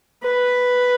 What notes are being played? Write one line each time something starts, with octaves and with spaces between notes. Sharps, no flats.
B4